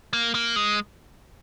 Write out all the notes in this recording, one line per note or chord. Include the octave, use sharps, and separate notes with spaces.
A#3
A#3
G#3